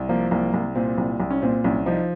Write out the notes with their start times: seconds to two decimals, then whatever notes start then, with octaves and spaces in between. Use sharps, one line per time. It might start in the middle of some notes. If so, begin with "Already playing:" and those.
Already playing: C2
0.09 F3 A#3
0.31 C2 A#3
0.54 C2
0.75 A#2 C4
0.98 C2
1.20 C2
1.31 C#4
1.42 A#2 C4
1.64 C2 C#4
1.86 F3 D#4